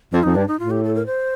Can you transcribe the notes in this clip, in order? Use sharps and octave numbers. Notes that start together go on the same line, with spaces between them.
F2 F4
F2 D#4
G2 D4
D#4
A2 F4
G4
A4
A#4
C5